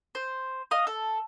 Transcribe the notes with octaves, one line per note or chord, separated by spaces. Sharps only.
C5
D#5 F5 D#6
A4